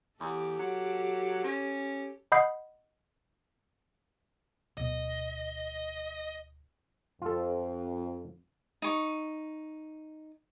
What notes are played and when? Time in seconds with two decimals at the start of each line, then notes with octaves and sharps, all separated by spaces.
0.20 E2 G4 A4
0.59 F#3
1.44 C#4
2.32 D#5 F#5 B5 D#6 G6 C7
4.78 D1 B2 D#5
7.22 F2 F4 A4
8.82 D#4 C#6